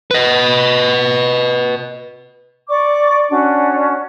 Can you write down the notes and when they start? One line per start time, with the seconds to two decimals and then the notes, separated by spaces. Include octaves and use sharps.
0.11 B4 D#5
2.68 D5 C#6 D6
3.29 C#4 D4 F#4